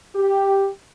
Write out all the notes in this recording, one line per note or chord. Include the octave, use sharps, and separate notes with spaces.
G4